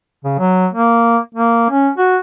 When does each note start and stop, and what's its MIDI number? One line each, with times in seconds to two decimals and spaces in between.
0.25 0.35 49
0.39 0.67 54
0.74 1.18 58
1.35 1.68 58
1.71 1.89 61
1.98 2.18 66